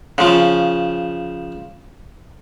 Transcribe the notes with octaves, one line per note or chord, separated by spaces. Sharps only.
C#3 F3